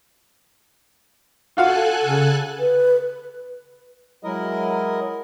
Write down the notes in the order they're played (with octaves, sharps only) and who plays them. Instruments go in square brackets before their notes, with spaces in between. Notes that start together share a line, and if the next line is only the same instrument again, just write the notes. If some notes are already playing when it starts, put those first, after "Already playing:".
[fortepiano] F4 F#4 F5 [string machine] A4 G#5 F#6
[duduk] C#3
[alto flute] B4
[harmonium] F#3 G#3 E4 A#4 D#5